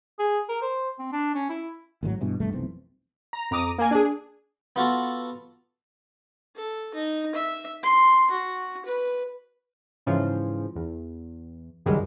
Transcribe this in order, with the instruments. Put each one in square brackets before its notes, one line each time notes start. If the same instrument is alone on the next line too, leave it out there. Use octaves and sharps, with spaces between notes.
[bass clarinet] G#4
A#4
C5
C4
D4
C#4
E4
[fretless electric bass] G#1 A2 D#3 F#3
G2 B2 E3
E1 C2 G2 A3
F1 B1 E3 C4
[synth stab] A#5
F2 A#5 D6 D#6
A#3 G#5
D4 G#4
[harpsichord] B3 F4 F#4 A4
[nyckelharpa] A4
D#4
E5
C6
F#4
B4
[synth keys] G#2 C#3 E3 F3
E2
C#2 F#2 D#3 G3 G#3